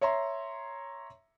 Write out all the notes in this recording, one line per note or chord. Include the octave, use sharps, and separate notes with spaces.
C#5 E5 A#5 C6